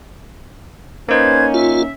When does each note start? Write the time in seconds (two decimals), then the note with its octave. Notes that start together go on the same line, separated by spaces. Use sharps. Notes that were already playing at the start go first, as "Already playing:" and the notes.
1.09 A#3 C#4 D#4 B4 C5 G#6
1.54 F4 E5